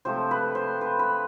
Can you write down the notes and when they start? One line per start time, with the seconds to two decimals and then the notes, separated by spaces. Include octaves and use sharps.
0.05 C3 F3 A3 C5
0.31 B4
0.55 C5
0.81 B4
0.99 B4